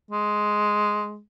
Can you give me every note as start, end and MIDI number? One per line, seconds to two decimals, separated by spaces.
0.11 1.20 56